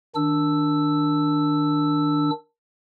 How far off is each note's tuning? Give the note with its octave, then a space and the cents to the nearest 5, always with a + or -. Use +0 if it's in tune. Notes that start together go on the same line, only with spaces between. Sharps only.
D#3 +0 D4 +0 E6 +0